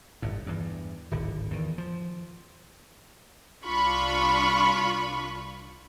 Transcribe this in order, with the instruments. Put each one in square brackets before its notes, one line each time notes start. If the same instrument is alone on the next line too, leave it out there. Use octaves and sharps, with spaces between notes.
[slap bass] G1 A2
E2 G2
D1 G#1 D3
E2 D#3
F3
[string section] C2 D4 F4 B5 C#6